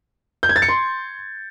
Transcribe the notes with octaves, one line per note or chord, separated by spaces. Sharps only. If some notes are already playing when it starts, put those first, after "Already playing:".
G6
G#6
A6
C#7
C6